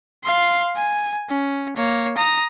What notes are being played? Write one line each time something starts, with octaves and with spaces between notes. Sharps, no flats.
F5 C6
G#5
C#4
A#3 C#5
A#5 D#6